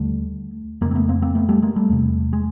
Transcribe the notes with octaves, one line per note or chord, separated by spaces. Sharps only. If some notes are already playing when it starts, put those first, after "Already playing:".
Already playing: D#2 D3 G3 A3
F2 C#3 G#3 A#3
C4
A3 B3
A#3 C4
A#3 C4
A3 B3
G3 A3
G#3 A#3
G3 A3
E2 C3
G#3